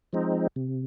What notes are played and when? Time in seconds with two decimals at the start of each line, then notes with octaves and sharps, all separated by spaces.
0.13 F3 G#3 C4 D#4
0.56 C3